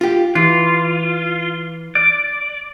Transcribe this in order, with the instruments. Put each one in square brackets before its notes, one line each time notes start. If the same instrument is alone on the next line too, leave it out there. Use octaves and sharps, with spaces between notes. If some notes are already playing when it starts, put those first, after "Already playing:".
[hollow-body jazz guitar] F4 G4
[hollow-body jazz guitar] E3 [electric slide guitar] F4
[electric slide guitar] D5